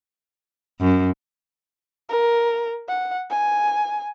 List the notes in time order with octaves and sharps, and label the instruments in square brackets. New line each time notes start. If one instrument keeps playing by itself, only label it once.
[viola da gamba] F#2
[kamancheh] A#4
F#5
G#5